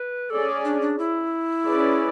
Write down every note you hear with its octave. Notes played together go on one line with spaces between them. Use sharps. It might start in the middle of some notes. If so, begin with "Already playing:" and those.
Already playing: B4
C#4 G#4 A4 D5
D4
D4
E4
C#4 G#4 B4 D5